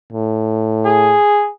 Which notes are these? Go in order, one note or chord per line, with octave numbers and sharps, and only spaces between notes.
A2
G#4